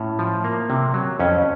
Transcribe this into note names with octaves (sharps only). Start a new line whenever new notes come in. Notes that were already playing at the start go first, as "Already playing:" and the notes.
Already playing: A2 C#4
F3
A#3
C3
F#3
F2 C#4